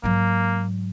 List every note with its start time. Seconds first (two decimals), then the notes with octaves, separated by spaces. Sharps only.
0.04 G#2 F#3 A#3